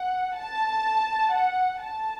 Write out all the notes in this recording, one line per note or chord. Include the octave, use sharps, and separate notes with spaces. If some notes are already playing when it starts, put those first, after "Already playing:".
Already playing: F#5
A5
F#5
A5